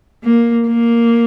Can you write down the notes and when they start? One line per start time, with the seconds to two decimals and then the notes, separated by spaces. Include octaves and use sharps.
0.23 A#3
0.66 A#3